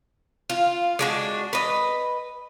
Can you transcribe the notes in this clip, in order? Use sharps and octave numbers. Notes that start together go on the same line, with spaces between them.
F4
G#3 D4 F#4
B4 D#5